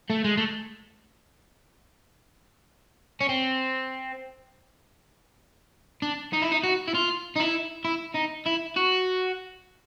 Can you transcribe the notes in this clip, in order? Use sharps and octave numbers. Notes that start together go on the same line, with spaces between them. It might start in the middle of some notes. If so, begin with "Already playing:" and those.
A3
G#3
A3
C#4
C4
D4
D#4
E4
D#4
F#4
E4
F4
D#4
E4
E4
D#4
E4
F#4